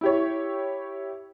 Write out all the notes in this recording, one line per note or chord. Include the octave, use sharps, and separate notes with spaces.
E4 G4 C#5